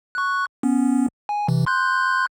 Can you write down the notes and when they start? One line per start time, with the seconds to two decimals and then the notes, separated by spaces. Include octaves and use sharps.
0.15 C#6 F#6
0.63 B3 C#4
1.29 G#5
1.48 C3 E3
1.66 C6 F#6 G6